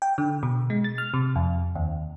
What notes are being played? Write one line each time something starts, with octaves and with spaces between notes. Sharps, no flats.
G5
D3
B2
G#3
A6
F6
C3
F2
D#2